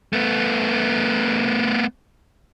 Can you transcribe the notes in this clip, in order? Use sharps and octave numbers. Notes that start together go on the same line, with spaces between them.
A3 B3